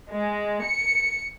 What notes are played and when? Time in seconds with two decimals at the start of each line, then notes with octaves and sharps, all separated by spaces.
0.10 G#3
0.64 C#7